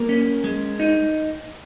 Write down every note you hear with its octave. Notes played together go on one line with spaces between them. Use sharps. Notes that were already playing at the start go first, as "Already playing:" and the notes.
Already playing: A#3 A#4
C#4
G#3
D#4